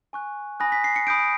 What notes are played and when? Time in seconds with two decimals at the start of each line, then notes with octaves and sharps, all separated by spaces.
0.13 G#5 C#6 F#6
0.60 G#5 B5 D#6 F#6 A#6
0.72 B6
0.84 C7
0.96 C#7
1.07 B5 D#6 G6 D7